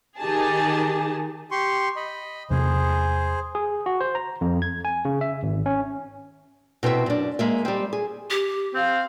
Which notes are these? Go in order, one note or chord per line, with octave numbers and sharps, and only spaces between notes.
D#3 D#4 G4 G#4 A5
G4 C6 C#6
D#5 B5
E2 C3 A#3 G#4 C5
G#4
F#4
C5
A#5
F2
G#6
G#5
C#3
E5
G#1
C#4
B2 C4 E4 E5
F#2 D4
G#3 A#3 E5
G3 C4
G#4
G4
C4 F5